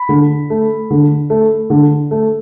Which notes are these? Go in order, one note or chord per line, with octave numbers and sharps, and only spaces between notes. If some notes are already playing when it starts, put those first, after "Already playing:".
Already playing: B5
D3
A3
D3
A3
D3
A3